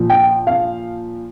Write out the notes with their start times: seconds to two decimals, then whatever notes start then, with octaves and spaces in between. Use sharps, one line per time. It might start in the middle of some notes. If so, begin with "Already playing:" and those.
Already playing: A#2 F3
0.10 G5
0.47 F5